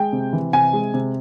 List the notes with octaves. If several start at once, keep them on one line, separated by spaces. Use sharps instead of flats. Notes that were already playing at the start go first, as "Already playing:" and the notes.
Already playing: G#3 G5
C3
E3
C3 G#5
G#3
C3